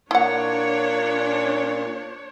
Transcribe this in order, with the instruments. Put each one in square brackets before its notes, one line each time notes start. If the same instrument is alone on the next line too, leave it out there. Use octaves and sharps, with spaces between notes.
[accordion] A#2 [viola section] D4 C#5 [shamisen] E4 F#5